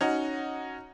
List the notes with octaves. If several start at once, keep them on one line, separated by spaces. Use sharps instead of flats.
C#4 D#4 F#4